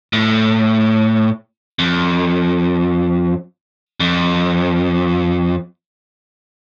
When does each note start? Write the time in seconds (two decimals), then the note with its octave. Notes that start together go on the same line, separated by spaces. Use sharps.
0.13 A2
1.79 F2
4.00 F2